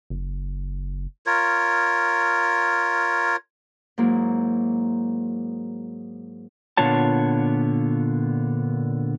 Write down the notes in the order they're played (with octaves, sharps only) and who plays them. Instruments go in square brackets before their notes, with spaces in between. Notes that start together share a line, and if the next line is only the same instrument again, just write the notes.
[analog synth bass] F#1
[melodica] F4 A#4 C#5
[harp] G#2 F#3 A#3 E4
[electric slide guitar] A#2 D3 B3 F4 C#5 A5